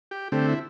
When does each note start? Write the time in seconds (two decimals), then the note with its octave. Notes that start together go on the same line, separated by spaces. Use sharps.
0.11 G4
0.32 D3 A3 C4 G4
0.48 E4